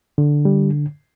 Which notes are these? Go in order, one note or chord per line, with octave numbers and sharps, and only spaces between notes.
D3
G3